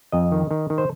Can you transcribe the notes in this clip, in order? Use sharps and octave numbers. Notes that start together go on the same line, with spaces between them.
F2 D#5
D#3
D#3
D#3
C5